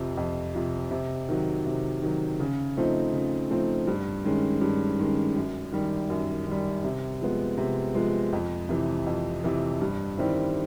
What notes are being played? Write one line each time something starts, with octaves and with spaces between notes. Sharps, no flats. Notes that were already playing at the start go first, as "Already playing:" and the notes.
Already playing: F2 C3 F3
F2
C3 F3
C3
D#3 F#3
C3
D#3 F#3
C#3
F3 A3 C4 D#4
C#3
F3 A3 C4 D#4
G2
D#3 G#3 C#4
G2
D#3 G#3 C#4
F#2
D#3 G3
F#2
D#3 G3
C3
F3 G#3 B3
C3
F3 G#3 B3
F2
C3 E3
F2
C3 E3
G2
D#3 G3 C4 E4